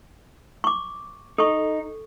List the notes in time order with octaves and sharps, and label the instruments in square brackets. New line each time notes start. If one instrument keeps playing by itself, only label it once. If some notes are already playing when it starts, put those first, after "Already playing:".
[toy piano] C#6 D6
[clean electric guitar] D#4 [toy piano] A4 C#6